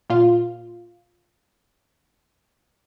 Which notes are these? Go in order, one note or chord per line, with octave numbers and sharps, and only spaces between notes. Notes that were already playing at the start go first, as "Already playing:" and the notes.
A#2 F4